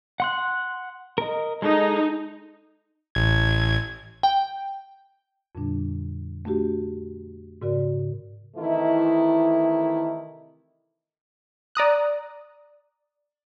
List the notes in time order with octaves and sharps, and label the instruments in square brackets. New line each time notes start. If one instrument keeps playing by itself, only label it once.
[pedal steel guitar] F#5 C6 F#6
A#4 D#5
[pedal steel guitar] G#3 A4 [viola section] D#4
[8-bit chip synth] A1 G#6
[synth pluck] G5
[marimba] F2 A#2 D3 G3 D4
A3 D4 F#4 G4
G#2 C#3 F#4 A#4 D5
[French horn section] C3 D#3 E3 A3 D#4 E4
[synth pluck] D5 A#5 D#6 F#6